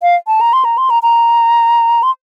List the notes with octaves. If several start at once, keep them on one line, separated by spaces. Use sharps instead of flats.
F5
A5
A#5
C6
A#5
C6
A#5
A#5
C6